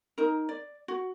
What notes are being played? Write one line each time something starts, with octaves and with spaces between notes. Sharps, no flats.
D#4 A#4
D5
F#4